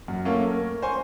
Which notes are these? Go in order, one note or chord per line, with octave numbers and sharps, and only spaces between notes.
F#2
A3 A#3 C#4
A#4
C5 G#5 C#6